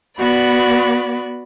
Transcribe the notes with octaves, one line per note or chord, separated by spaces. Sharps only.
B3 F#4 D5 B5